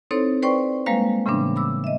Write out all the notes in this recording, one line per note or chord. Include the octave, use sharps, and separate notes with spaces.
C4 D#4 E4 A4 C5 C#5
B4 C5 D5 G5 C6 C#6
G3 G#3 A#3 B4 C5 F5
A2 C#3 E3 G3 B3 D4
B5 D6 E6
D#5 E5